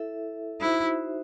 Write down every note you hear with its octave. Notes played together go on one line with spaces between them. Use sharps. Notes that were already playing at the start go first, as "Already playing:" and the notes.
Already playing: E4 A4 E5
D#4 E4 F#4 C5 E5